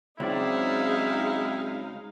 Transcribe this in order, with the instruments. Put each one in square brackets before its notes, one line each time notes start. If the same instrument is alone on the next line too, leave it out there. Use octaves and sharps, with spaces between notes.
[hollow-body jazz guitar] C#2 [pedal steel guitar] F#3 C4 D5 [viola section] G#3 D#4 F5 [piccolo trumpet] E4